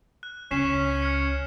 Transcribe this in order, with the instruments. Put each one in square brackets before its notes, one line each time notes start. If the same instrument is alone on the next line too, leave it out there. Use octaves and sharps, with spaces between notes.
[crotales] F#6
[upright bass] C#2 [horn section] C#4 [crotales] B6 C7 E7
[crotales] F6 G#6 C#7